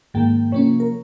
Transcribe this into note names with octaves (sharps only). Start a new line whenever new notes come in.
G#2 D#3 A#3 G5
C3 F3 A#3 C#4 C#5
A#4